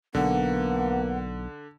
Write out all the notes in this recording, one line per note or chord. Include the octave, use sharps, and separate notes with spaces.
B1 D3 A#3 B3 F#5